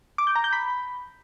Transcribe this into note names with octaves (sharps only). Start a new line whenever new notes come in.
D6
G6
A#5
G6
B5